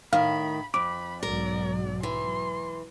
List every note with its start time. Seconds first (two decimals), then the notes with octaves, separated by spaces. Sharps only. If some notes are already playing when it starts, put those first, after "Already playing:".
0.13 A2 D#3 F5 B5
0.74 F2 B5 D6
1.23 B1 G#2 F#3 A#4 D5
2.03 E3 C6